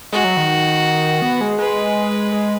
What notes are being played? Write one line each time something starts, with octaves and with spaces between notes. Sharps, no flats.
G#3 F#4
F#3
D#3
B3
G#3
G#3 B4
G#3